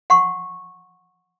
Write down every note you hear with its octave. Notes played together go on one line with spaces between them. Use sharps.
F#5 C6 C#6